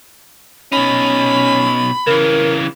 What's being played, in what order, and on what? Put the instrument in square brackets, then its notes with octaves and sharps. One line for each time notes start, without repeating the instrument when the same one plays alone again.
[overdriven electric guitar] B2 D#4 [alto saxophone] C#4 [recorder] B5
[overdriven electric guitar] C#3 E3 [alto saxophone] A#4